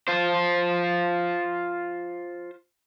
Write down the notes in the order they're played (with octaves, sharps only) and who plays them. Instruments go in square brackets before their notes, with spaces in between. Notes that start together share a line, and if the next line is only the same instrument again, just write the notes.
[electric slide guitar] F4 C5